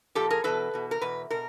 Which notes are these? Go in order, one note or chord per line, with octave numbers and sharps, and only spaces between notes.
A#2 F3 G4 A4
G#4 A#4
E2 B2 A4 B4
E2 B2
A#4
E2 B2 B4
B2 A#4